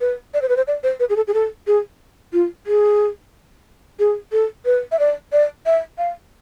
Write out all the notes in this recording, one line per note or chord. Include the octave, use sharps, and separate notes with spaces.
B4
D5
C5
B4
C5
D5
C5
B4
G#4
A4
G#4
A4
G#4
F4
G#4
G#4
A4
B4
E5
D5
D5
E5
F5